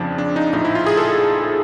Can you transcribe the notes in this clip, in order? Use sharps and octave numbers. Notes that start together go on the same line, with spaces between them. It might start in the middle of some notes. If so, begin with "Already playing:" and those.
Already playing: F2 C#3 F3 D4
D4
D#4
A#1 A2 F3 D#4
E4
F4
G#4
A4